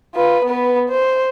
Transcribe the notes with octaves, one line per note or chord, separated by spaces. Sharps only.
F4 B4
B3 B4
C5